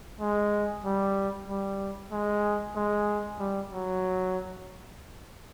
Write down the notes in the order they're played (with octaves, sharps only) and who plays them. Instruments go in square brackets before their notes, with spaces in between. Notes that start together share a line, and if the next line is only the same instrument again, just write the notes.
[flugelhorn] G#3
G3
G3
G#3
G#3
G3
F#3